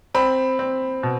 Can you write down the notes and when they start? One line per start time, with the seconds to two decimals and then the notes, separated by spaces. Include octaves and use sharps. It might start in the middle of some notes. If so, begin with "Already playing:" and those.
0.15 C4 B5
0.59 C4
1.03 B2